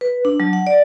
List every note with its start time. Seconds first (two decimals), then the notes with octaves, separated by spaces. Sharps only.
0.01 B4
0.25 D4
0.40 F#3
0.53 F#5
0.67 D5